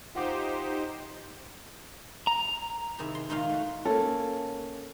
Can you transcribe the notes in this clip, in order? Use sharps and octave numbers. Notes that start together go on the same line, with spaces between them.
D#4 F4 G4 C5 F#5 D6
A#5
C3 D#3 E4 G#4
C6
A#2 D#3 G#3 D#4 F4 F5
A3 F#4
A#3 C#4 A4